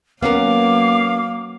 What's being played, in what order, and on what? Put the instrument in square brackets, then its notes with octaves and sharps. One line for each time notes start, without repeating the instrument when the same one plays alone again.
[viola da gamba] F#3 A#3 [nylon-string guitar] B3 C#4 A#4 [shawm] F5 [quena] D6